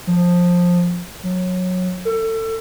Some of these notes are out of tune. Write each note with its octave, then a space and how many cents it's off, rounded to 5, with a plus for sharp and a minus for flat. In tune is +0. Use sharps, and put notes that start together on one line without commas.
F3 +15
F#3 -20
A4 +30